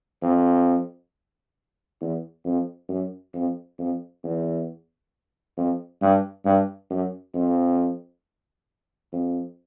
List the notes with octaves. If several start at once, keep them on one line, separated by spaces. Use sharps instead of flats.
F2
E2
F2
F#2
F2
F2
E2
F2
G2
G2
F#2
F2
F2